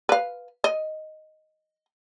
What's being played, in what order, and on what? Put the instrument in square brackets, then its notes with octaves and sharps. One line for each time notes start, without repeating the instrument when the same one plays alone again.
[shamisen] B4 F5
D#5